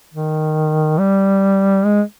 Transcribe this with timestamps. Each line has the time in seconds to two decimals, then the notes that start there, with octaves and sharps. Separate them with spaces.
0.14 D#3
0.99 G3
1.85 G#3